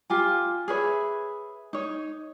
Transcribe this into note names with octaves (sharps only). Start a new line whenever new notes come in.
F4 G4 G#5
G#4 B4 C#5 E5
D#4 C#5